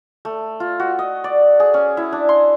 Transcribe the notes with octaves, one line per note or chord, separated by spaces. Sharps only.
A3
F4
F#4
D#5
D5
G#4
C#4
E4
D4
C6